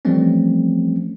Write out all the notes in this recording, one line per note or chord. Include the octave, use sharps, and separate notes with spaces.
E3 F3 G3 A3 C4 C#4